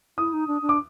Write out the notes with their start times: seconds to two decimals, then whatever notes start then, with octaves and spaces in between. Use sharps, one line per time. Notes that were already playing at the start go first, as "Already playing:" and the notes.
0.18 E4 D#6
0.33 D#4
0.47 D4
0.62 D4
0.69 D6